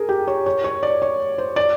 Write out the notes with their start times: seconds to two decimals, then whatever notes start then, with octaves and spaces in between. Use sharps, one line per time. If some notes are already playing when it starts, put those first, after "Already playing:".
Already playing: G#4 A#4
0.09 G4
0.27 C#5
0.46 C#5
0.64 C#5
0.83 D5
1.02 C#5
1.38 C5
1.56 D5